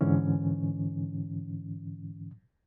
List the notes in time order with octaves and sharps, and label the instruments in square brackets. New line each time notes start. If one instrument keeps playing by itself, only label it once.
[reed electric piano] G#2 D3 E3 C#4